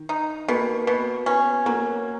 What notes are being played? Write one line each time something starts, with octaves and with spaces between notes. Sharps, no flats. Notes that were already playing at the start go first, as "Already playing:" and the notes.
Already playing: D#3
D#4
B2 A#3
B2 B3
B3 C#4
F#3 A#3